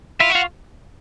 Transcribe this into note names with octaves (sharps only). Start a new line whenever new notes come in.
E4 F4 E5
F#4
F4 F5